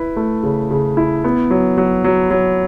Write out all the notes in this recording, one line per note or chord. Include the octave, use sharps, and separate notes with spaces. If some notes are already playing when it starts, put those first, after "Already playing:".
Already playing: E4 B4
A3
C#3
C#3
E4
B3
F#3
F#3
F#3
F#3